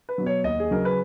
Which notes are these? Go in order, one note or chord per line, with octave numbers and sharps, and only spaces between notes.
B4
B2 F#3
C#5
D#2 D#5
G#4
C#3 F#3 A#4
B4